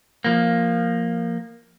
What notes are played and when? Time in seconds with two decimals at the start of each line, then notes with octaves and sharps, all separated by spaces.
0.24 F3 A#3